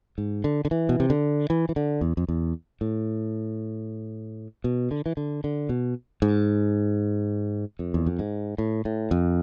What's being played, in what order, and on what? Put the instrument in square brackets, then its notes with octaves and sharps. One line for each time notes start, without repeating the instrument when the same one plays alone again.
[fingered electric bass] G#2
D3
D3
E3
B2
C3
D3
E3
E3
D3
E2
F2
E2
A2
B2
D3
E3
D3
D3
B2
G#2
F2
E2
F2
G#2
A2
A2
F2